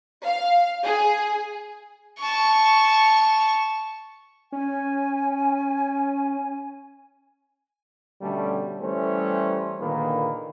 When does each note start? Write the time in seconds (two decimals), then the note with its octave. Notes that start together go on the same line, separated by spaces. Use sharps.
0.25 F5
0.85 G#4
2.20 A5 C#6
4.52 C#4 G#5
8.21 B2 D3 G3 A3 C#4
8.81 E3 G3 A3 C#4 C5
9.79 A#2 D3 D#3 A#3 G#4 B4